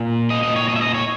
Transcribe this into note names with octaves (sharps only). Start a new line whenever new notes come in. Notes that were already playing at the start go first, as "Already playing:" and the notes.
Already playing: A#2
D#5
D#5
C#5
D#5
E5
D#5
C#5